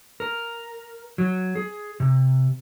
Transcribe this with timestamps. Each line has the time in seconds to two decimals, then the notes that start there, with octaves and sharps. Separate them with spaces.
0.20 A#4
1.18 F#3
1.56 G#4
2.00 C3